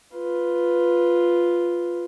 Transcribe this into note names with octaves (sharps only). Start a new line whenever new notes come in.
F4 B4